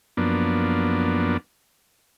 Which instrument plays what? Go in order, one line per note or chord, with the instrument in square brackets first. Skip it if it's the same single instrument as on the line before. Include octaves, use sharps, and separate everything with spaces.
[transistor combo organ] F#2 F3 A#3 B3 D4